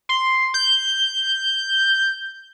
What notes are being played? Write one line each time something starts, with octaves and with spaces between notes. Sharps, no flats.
C6
G6